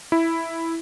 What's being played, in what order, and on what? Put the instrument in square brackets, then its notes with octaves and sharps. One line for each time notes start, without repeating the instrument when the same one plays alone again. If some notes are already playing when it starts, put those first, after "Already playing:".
[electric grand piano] E4